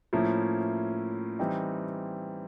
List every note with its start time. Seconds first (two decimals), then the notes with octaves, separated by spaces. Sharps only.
0.13 A2 F3 A#3 C#4 E4
1.39 E3 G3 C4 D#4